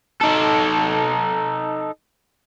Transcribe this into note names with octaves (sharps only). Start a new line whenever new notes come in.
D#4 A4